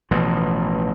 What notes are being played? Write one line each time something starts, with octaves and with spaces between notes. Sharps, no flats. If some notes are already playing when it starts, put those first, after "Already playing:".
A1 B2 E3 F3